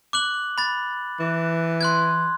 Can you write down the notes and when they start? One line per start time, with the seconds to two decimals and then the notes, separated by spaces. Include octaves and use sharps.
0.13 D6 F#6 F#7
0.58 B5 A6
1.19 E3
1.81 C6 F#6 G#6